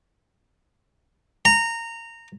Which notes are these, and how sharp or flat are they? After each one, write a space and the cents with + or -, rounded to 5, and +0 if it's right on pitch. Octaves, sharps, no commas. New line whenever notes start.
A#5 -20